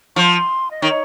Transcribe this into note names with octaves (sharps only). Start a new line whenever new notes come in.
F3 C6 C#6
D#5
D#3 C#5